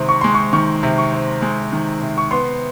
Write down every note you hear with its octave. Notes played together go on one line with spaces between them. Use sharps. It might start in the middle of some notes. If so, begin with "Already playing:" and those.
Already playing: C3 D#3 G#3 C4 C6
C#6
G#3 C6
C#6
D#3 C#6
C3
C#6
C4
G#3
D#3
C3
C#6
B3 C6